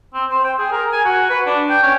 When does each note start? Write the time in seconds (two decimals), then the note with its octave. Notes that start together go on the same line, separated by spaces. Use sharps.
0.14 C4
0.31 C5
0.44 G5
0.58 G#4
0.72 A#4
0.92 G#5
1.05 F#4
1.29 B4
1.46 D4
1.70 G5
1.82 C#4